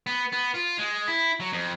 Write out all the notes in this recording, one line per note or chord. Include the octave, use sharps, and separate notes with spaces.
B3
B3
F4
G#3
E4
F#3
F2